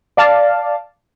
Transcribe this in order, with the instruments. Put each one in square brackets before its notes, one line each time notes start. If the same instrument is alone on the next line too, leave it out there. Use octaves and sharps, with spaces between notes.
[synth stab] D5 F5 A5